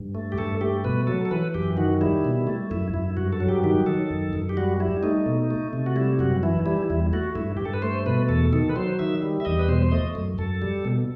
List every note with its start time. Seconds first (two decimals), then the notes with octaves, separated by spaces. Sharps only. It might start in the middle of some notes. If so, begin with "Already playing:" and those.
Already playing: G2
0.15 A3
0.32 G4
0.38 G2 A4
0.61 A3 G4
0.84 B2 B4
1.07 F#3 A4
1.25 A4
1.31 E3 B4
1.54 F#2 G4
1.77 D#3 F#4
2.01 G3 E4
2.25 B2
2.47 A3
2.71 F#2 E4
2.94 F#2 E4
3.17 G2 F#4
3.33 A4
3.40 F#3
3.49 G4
3.64 D#3 G4
3.86 D#3 A4
4.11 F#2
4.33 F#2
4.49 G4
4.57 G3 F#4
4.80 G3 E4
5.03 A3 D#4
5.26 B2
5.51 A3
5.73 C3
5.86 F#4
5.96 G3 E4
6.19 F#2 F#4
6.43 E3 E4
6.66 G3 E4
6.90 E2 E4
7.13 A3 F#4
7.35 G2 E4
7.57 G2 G4
7.65 A4
7.74 B4
7.82 A3 C5
8.06 B2 B4
8.29 E2 A4
8.53 D#3 A4
8.69 B4
8.76 F#3 C5
8.99 D#3 E5
9.22 G3
9.40 E5
9.45 E2 D#5
9.59 B4
9.68 B2 C5
9.82 C5
9.92 A3 D#5
10.15 F#2
10.38 F#2 A4
10.62 G3
10.85 B2